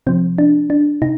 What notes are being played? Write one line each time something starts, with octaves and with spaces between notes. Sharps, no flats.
C3 F3 C4
D4
D4
C3 D#4